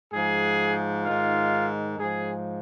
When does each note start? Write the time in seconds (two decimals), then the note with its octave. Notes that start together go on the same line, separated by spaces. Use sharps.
0.12 G#2 F3 G#4
1.05 G#2 D#3 F4
1.98 G#2 F3 G#4